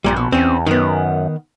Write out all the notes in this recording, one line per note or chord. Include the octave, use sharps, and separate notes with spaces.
A#1 G2 A#2 G3
B2
E2 C4 C#4
F#2 D#3 B3